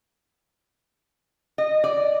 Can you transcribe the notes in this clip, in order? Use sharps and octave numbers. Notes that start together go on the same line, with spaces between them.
D#5
D5